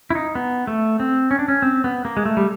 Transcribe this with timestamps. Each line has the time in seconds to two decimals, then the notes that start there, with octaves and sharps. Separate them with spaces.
0.10 E4
0.15 D#4
0.35 B3
0.67 A3
1.00 C4
1.31 C#4
1.39 D4
1.48 C#4
1.62 C4
1.84 B3
2.05 A#3
2.17 G#3
2.25 A3
2.37 G3